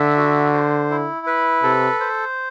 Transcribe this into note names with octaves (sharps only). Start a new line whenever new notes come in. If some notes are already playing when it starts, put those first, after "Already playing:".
Already playing: D3 E5
F#4
C5
E4
B4
C3 A4
C5